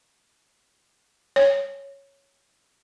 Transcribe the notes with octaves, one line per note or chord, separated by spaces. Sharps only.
C#5